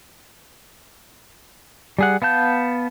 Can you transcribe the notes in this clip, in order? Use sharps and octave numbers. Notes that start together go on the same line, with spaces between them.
G3 G#4 F#5
B3 F5 A5 G6